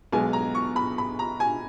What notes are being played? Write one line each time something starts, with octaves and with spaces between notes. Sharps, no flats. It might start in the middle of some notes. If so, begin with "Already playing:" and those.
B1 B2 G#3 B3 G#5
A#5
C#6
B5
B5
A#5
G#5